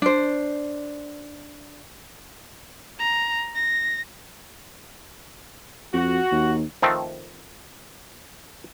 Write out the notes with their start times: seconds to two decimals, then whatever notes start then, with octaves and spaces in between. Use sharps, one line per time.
0.02 D4 C5
2.99 A#5
3.55 A#6
5.93 F2 F#4
6.32 D#2
6.82 D#3 F3 A3 C4